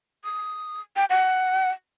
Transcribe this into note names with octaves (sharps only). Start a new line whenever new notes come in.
D#6
G5
F#5